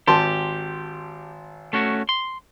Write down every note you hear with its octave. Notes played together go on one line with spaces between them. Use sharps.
G#1 G4 A5 C6
A3 C#4 F#4
C6